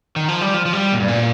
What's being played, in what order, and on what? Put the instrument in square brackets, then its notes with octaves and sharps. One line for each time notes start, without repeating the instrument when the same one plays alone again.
[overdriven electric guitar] D#3
F3
G3
F3
F3
G3
A#2
G2
A#2